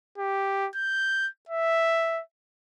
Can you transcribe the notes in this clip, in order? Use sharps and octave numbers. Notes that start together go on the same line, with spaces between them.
G4
G6
E5